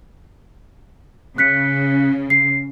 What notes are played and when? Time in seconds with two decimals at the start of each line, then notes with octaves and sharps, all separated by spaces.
1.38 C#3 F#6 B6 C#7
2.30 C7